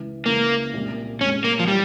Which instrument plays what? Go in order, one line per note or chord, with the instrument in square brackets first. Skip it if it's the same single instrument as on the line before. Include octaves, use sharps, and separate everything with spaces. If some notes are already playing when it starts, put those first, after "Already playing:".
Already playing: [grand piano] C#2 C#3 E3
[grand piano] C#2 C#3 E3 [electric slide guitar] A#3
[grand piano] C2 A#2 G#3
[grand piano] C2 A#2 G#3 [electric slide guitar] C#4
[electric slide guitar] A#3
F3
[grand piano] E3 [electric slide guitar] G3